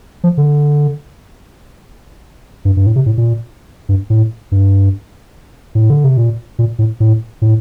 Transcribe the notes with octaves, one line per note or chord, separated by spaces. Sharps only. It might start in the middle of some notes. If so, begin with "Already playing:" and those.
F3
D3
G2
G2
A2
C3
A2
A#2
G2
A2
G2
A2
D3
C3
A#2
A#2
A2
A2
A2